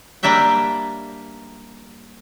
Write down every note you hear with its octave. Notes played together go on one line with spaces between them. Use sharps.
G3 A#3 D4 E5 G5